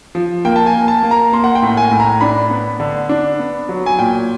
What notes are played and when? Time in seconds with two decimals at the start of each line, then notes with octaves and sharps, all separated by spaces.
0.15 F3
0.45 A#3 G5
0.56 A5
0.66 G#5
0.73 A#3
0.88 A5
1.03 A#3
1.11 A#5
1.33 A#3 C6
1.44 F#5
1.55 G5
1.62 A2
1.77 G#5
1.91 A2
2.00 A#5
2.21 D4 B5
2.50 B3
2.80 D3
3.09 D4
3.39 B3
3.69 F#3
3.86 G#5
3.99 A#2 G5